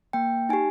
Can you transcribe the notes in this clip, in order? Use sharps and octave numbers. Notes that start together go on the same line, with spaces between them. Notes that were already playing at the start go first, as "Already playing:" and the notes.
A#3 G5
D#4 G4 G#5